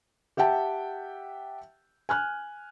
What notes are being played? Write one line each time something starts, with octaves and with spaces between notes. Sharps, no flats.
G4 E5 F#5 G5 A5
G#5 F6 F#6